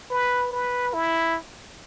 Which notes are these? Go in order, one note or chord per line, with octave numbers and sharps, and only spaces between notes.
B4
B4
E4